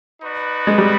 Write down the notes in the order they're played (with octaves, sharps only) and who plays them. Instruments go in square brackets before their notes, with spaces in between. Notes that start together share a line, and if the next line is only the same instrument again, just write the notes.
[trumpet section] D#4 F#4 B4 D5
[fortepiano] G#3
G3